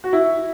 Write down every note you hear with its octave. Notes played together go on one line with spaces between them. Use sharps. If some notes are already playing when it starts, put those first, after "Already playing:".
F#4
E4